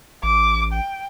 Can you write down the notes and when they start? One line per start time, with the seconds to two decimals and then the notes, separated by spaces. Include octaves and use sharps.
0.23 A1 D6
0.73 G5